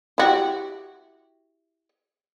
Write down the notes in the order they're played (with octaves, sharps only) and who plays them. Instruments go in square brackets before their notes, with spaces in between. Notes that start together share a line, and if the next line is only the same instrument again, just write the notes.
[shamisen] E4 F#4 G4